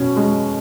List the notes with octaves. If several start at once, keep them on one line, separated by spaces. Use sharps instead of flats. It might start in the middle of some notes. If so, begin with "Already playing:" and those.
Already playing: B2 C#4
G#3